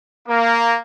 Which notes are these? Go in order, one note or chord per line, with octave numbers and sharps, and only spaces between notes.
A#3